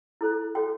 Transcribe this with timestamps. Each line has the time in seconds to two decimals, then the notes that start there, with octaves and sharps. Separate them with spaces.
0.21 E4 A4 C5
0.55 F#4 A4 C#5 G5